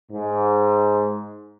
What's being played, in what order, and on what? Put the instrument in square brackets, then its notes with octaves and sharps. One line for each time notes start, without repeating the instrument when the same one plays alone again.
[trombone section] G#2